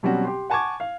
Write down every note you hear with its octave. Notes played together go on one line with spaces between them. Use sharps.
B2 F#3 G3 C4 C#4 F#4
G4 C6
F#5 G#5 A5 C#6 D6 G#6
F5